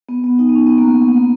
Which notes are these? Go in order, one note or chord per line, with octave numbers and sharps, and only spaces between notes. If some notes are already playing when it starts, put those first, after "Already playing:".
B3
B3
D#4
B3
C#4
B3
A#3
A#3
B3
A#3
B3